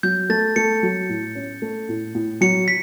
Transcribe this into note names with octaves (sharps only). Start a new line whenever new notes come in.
F#3 G6
A3 A6
A3 C#7
F#3
A2
C#4
A3
A2
A2
F#3 C#7
B6